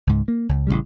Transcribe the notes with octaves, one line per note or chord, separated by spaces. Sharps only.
C#2 G#2
A#3
C#2
A1 G#2 C#3 G3